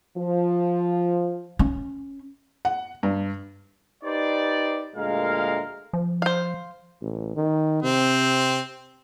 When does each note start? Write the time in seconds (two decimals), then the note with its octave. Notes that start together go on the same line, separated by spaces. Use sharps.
0.17 F3
1.59 C#4
2.65 F#5
3.03 G2
4.04 D#4 G4 B4 C5 D5
4.95 D2 A#2 G#3 A#4 F5
5.93 F3
6.22 C5 F5
7.01 A1
7.35 D#3
7.83 C3 C4